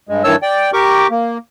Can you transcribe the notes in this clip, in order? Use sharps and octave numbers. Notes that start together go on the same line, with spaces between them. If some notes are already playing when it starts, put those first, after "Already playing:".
G2 G#3
G2 D#3 E3 C#5 A5 E6
D5 G5
G4 A#4 C#6 D6
A#3